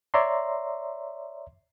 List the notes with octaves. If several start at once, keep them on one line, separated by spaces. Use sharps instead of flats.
C#5 D5 E5 A#5 C6